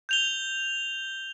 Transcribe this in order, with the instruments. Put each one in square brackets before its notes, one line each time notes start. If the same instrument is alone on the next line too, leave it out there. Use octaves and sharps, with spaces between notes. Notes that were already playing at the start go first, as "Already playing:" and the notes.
[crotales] G6 F7 G7